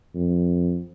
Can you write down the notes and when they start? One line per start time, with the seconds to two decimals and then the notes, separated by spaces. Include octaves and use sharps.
0.15 F2